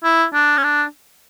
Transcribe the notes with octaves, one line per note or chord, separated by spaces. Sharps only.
E4
D4
C#4
D4